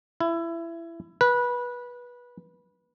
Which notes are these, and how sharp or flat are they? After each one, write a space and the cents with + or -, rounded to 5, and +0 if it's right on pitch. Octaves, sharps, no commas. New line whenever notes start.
E4 +20
B4 -20